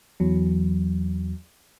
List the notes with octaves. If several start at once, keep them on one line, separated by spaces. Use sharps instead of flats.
E2 F#3